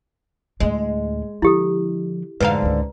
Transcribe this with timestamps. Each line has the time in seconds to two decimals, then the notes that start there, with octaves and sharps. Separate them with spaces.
0.60 D2 A2 G#3
1.42 D3 F3 E4 G4 A4
2.40 F2 G#2 D3 B4 F5 A#5
2.62 C#2 G#3